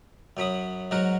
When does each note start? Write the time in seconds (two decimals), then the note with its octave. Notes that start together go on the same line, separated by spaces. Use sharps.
0.37 F#2 F#3 B5 D#6
0.91 G#2 F#3 F#4 A#4